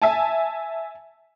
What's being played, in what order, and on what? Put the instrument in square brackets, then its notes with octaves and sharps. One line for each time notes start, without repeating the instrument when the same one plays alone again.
[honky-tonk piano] E5 G#5 A5